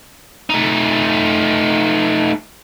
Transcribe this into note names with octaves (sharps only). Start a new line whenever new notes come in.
A3 D#4